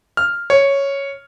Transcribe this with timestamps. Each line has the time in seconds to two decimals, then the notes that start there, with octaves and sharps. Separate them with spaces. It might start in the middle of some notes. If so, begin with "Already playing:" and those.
0.17 F6
0.50 C#5